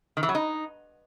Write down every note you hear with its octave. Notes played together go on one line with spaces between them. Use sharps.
D#3
E3
F#3
D#4